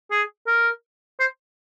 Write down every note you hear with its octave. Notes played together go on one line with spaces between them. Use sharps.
G#4
A#4
C5